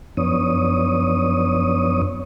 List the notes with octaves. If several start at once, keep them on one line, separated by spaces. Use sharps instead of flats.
F#2 F3 B3 D4 C#5 D#6